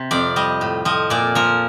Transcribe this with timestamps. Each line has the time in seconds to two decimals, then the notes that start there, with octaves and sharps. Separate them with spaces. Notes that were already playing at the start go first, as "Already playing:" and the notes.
Already playing: C3
0.11 F2 D5
0.36 G3 D#5
0.61 A2
0.85 F3 D#5
1.10 A#2 D5
1.35 F3 A#4